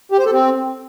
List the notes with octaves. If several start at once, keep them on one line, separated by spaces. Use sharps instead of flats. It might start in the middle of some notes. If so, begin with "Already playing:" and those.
G4
C5
A4
C4